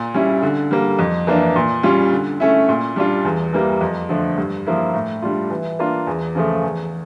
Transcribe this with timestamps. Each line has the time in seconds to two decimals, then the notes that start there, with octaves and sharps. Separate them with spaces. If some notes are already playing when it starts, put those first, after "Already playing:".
Already playing: A#2
0.14 G3 C#4 E4
0.42 D3
0.71 G3 A#3
0.99 F2
1.27 E3 A#3 D4
1.56 A#2
1.83 G3 C#4 F4
2.12 D3
2.40 A3 C#4 E4
2.69 A#2
2.96 G3 D4 F4
3.25 E2
3.53 E3 G3 A#3
3.81 F2
4.09 D3 F3 A3
4.38 G2
4.67 F3 A#3 E4
4.94 A2
5.22 G3 D4 F4
5.50 E3
5.79 A#3 D4 F4
6.07 E2
6.35 C#3 F3 A3
6.64 E2